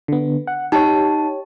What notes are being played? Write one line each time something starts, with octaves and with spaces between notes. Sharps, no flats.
D3 B3
F#5
D#4 G4 C#5 A5